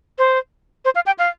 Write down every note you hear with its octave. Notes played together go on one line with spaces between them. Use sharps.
C5
C5
F5
G5
F5